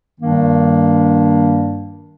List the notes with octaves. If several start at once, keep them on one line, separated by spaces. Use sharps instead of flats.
G2 D#3 G3 A#3 D4